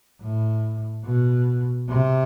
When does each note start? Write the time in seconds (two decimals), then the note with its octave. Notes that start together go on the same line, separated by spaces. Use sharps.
0.21 A2
1.05 B2
1.89 C3